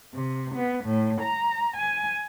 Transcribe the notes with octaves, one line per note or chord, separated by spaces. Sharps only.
C3
B3
A2
A#5
G#5